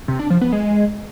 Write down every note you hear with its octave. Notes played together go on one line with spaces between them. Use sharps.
C3
D4
F3
B3
G#3